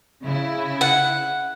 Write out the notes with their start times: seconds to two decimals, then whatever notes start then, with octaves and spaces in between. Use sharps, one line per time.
0.22 C#3 E4
0.81 F#5